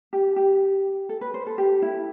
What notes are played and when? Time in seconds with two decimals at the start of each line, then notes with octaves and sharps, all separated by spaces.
0.13 G4
0.36 G4
1.09 A4
1.21 B4
1.34 C5
1.47 A4
1.58 G4
1.82 E4